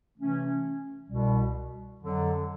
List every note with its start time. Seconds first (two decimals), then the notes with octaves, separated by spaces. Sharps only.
0.17 C3 E3 A3 C#4
1.09 C2 B2 G3
2.01 F2 D3 F#3